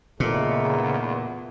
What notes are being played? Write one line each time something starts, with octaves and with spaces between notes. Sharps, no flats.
E2 A#2 C#3 A3 D#4 A4